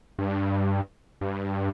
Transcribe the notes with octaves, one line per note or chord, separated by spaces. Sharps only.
G2
G2